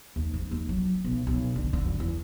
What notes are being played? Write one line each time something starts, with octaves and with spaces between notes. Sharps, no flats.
D#2
G#2
D#2
F#3
B1
B1
D3
D3
F#2
E2